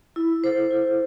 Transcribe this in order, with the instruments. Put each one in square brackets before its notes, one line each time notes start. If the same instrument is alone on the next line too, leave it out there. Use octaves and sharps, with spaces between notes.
[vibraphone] E4
A4 C5
E4